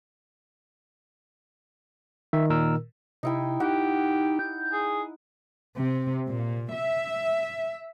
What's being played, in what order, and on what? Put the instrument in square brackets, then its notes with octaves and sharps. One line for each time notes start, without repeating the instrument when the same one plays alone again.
[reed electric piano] D#3 [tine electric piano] E5
[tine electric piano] A#2 A#4 E6
[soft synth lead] C3 [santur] D#4 E4 G5
[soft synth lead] D#4 [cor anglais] G4 [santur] F#5
[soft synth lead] G6
[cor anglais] G#4
[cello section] C3
A#2
E5